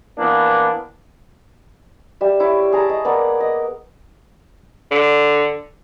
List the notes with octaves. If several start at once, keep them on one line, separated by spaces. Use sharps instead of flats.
E3 A#3 B3 D4
G3 E5
E4 C#5 C#6 D6
G#4 A5 A#5
D#5
A#3 B3 A#4 D5
D#5
D3